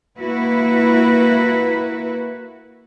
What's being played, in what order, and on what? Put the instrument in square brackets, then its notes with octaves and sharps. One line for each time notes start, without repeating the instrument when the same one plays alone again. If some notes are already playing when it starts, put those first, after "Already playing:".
[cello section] A#3 E4 F#4 B4